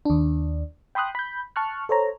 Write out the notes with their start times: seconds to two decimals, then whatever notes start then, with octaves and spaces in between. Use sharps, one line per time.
0.05 D#2 D4
0.95 G5 B5 C6 D#6 F#6
1.15 B5 G6
1.56 A5 C#6 F6 F#6
1.89 A4 C5 C#5 A#5